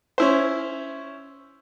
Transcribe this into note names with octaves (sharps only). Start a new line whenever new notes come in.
C#4 E4 C5